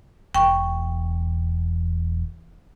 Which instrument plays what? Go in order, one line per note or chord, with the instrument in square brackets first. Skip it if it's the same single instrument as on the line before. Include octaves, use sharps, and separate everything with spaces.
[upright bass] E1 E2 [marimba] G5 C#6